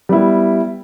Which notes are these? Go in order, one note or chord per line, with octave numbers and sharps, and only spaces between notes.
G3 B3 E4